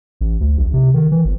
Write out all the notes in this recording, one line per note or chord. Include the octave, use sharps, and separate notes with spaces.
A1
D2
A#1
C3
D#3
E3
G1